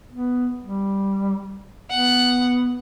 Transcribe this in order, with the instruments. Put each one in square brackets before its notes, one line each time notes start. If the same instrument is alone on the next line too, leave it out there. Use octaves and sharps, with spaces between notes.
[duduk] B3
G3
[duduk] B3 [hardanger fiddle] F#5